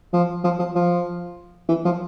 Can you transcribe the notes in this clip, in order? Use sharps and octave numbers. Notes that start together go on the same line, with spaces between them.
F3
F3
F3
F3
E3
F3